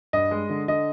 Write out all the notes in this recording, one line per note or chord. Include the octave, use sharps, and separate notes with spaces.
G2 D#5
G#3
D3
D3 D#5